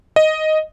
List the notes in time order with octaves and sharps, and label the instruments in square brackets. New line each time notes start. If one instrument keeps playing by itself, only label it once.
[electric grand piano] D#5